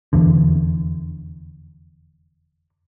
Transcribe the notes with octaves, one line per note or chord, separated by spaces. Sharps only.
F1 E2 D3